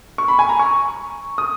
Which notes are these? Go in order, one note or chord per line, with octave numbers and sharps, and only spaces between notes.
C#6
B5
G#5
A#5
C#6
D#6